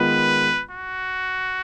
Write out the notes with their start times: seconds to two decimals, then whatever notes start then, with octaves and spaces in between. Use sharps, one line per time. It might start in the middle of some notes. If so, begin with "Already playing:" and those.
Already playing: D#3 G#3 B3 F4 B4
0.71 F#4